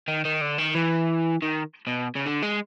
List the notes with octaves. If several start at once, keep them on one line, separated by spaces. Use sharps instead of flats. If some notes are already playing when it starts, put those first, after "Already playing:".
D#3
D#3
D3
D#3
E3
D#3
B2
C#3
D3
G#3